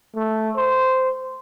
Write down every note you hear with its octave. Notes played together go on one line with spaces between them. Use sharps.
A3
C5